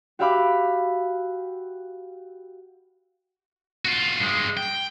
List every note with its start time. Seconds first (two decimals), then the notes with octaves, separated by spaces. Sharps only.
0.19 F#4 G4 E5 F5 B5 D6
3.85 F4 F#4
4.20 G2 G#3
4.57 G5